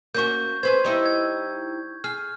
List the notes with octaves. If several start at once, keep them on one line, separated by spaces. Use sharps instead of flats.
A#3 C#4 F#4 C#6 G6
G#4 B4 C5 G#6
G3 D#4 E4
G#6
G#4 F6